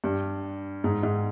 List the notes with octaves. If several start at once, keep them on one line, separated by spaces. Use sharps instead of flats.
G2
G#2
G#2